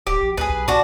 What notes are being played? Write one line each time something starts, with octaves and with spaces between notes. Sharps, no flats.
D1 G4
A#1
C#2 G#4 B4
B1
C2 D4 F#4